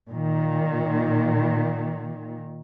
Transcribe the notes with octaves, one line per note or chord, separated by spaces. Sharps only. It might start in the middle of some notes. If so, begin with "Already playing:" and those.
A#2 D#3